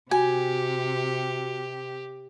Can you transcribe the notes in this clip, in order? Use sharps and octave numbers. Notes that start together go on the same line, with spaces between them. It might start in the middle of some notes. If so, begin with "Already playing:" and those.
C3 F#4 G4 G#5